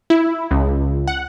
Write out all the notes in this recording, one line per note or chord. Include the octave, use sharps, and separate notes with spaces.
E4
C#2
F#5